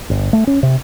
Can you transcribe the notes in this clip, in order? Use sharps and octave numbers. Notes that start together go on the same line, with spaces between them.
G1
A3
C#4
C3